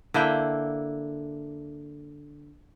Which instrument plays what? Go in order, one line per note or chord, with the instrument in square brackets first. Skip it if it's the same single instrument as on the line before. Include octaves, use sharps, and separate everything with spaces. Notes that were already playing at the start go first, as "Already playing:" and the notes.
[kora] D3 A#3 E4 G5